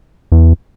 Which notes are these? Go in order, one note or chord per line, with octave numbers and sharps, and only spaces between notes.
E2